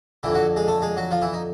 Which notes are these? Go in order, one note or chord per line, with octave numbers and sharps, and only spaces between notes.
F2 D3 E3 E4
F#3 F#4
G#3 G#4
A3 A4
G#3 G#4
F#3 F#4
F3 F4
E3 E4
D#4